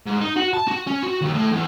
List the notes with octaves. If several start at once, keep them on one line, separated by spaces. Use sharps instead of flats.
G#2
D#4
F#4
A5
F#4
C#4
F#4
D#2
A2
E2